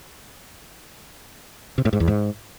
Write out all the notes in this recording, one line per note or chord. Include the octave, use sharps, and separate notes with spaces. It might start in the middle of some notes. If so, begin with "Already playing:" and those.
C3
A2
G#2
E2
G#2